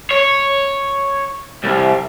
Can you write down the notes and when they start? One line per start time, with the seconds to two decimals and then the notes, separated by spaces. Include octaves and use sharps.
0.11 C#5
1.64 C2